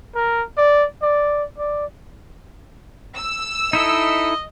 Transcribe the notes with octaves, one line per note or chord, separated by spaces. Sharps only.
A#4
D5
D5
D5
E6
D#4 E4 A4 D#5